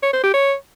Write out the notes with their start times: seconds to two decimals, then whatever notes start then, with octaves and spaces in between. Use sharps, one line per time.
0.03 C#5
0.13 C5
0.23 G4
0.34 C#5